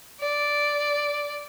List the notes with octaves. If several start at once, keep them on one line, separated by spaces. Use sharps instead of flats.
D5